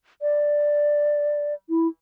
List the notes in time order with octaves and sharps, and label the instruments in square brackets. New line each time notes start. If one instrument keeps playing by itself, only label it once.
[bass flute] D5
E4